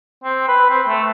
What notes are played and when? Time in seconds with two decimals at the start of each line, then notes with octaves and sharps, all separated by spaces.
0.24 C4
0.48 B4
0.70 C4
0.88 A3